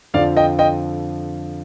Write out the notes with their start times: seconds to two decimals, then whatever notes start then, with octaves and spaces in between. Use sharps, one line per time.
0.14 F2 D3 F3 D5 F5
0.37 D#5 G5
0.59 D#5 G5